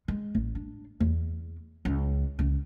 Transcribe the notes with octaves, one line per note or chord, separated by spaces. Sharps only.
G#3
A1
D4
E2
C#2
C#2